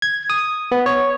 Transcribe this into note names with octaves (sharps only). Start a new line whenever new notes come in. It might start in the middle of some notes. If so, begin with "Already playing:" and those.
G#6
D#6
B3
C#5